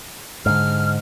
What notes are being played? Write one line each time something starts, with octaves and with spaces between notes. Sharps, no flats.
G#2 D3 F6